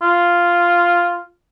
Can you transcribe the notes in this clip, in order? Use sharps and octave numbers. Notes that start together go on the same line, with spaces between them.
F4